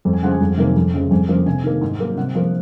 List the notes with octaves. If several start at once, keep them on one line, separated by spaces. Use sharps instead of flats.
F2
G#5
C#3 F3 G#3 F#5
G#5
F2
C3 D#3 F#3 A#3
F2
C#3 F3 G#3
F2 G#5
C#3 F3 A#3
C3 G#5
D#3 A#3
G#2
F#3 A#3
C3 F#5
F3 A#3